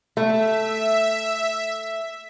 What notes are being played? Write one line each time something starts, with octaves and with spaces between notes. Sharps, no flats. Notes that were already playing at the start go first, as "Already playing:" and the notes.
A3 E5